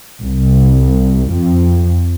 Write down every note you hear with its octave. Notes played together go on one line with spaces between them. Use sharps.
C2
F2